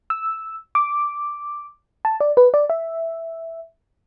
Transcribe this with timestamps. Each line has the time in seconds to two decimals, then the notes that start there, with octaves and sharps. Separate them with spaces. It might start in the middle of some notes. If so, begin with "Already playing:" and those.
0.10 E6
0.75 D6
2.05 A5
2.20 D5
2.37 B4
2.54 D5
2.70 E5